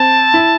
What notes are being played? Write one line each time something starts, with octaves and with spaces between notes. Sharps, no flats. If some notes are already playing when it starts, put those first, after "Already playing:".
Already playing: C4 A5
E4